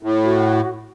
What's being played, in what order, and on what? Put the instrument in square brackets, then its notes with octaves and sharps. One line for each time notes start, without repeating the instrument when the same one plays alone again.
[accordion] A2
[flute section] F#4